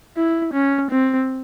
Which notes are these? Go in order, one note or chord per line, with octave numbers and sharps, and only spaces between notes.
E4
C#4
C4